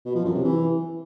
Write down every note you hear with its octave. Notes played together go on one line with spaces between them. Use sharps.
B2
F3
F#2
C3
E3